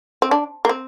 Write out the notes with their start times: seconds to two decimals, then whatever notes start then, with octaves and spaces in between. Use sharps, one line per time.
0.22 C4
0.31 D4
0.65 A#3
0.69 C4